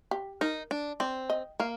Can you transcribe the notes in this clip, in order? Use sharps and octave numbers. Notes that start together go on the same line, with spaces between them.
G4
D#4 A#4
D4
C4 D5
D#5
A#3 F5